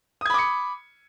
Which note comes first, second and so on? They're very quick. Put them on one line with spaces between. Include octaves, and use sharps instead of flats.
D#6 G#6 B5 D6 C#7